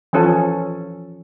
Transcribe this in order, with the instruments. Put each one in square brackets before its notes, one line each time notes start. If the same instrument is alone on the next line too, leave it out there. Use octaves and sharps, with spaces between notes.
[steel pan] E3 F3 C#4 A4